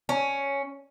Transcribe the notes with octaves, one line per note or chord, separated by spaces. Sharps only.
C#4